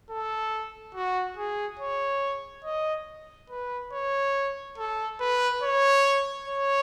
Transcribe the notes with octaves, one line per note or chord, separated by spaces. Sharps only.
A4
F#4
G#4
C#5
D#5
B4
C#5
A4
B4
C#5
C#5